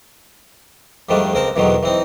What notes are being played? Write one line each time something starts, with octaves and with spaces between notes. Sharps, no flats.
F2 G#2 D#3 G3 A3 D4
C#2 C4 A#4 A5
E2 G#2 B2 D3 D#3 F#3
E3 C4 D#4